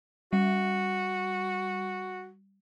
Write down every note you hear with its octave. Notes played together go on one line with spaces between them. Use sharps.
G3 F#4